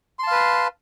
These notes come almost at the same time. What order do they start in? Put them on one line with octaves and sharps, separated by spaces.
C6 A5 F5 B4